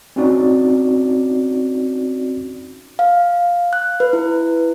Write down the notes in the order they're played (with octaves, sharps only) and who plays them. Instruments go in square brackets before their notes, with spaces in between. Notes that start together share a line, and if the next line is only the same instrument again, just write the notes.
[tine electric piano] C4 C#4 D#4 F#4 D5
[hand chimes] F5
F#6
B4
E4